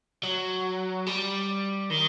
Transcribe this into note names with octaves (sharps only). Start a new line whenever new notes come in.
F#3
G3
D#3